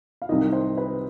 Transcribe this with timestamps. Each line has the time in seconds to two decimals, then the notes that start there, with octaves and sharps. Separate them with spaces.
0.22 F5
0.29 C2 C3 D#3 D#5
0.52 C5
0.77 B4